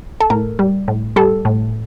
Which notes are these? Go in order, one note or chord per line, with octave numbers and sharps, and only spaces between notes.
A4
A2 A#4
G3
A2
G3 A4
A2